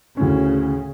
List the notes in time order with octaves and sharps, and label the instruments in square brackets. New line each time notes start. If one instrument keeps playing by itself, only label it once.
[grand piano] D2 A2 C#4 [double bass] C#3